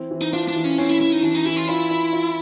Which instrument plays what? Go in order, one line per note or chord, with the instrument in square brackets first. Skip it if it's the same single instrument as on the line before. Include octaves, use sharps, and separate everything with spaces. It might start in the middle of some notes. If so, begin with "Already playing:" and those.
Already playing: [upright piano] E3 C4
E3
[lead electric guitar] D#4
[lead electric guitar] D4 [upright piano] F4
[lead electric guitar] D4
[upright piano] E3
[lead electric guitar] C#4
[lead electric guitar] C4 [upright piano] C#4
[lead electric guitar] E4
[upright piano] C#4 [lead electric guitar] E4
[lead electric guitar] D#4
[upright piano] E3 [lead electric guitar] D4
[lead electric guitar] D#4
[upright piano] E3 [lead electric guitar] E4
[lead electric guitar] F4
[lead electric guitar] E4 [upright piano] F4
[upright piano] F4
F4